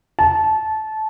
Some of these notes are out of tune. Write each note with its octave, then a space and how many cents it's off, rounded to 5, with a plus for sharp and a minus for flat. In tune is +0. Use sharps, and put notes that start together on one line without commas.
A5 -20